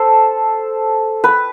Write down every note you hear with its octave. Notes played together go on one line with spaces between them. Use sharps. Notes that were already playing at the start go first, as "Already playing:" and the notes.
Already playing: A4 C5
B4